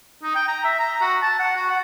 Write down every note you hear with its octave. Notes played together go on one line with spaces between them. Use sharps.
D#4
G5
A#5
E5
A#5
F#4
A5
F#5
F#4
F#5